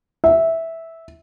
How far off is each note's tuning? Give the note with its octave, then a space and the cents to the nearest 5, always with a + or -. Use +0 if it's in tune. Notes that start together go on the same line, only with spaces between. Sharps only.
E5 -10